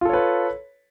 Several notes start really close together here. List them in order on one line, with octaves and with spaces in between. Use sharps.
F4 A4 C#5 B4